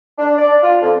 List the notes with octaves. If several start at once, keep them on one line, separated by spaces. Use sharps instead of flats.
D4
D5
F4
F2